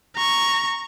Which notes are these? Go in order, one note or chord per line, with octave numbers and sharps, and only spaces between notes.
A#5 C#6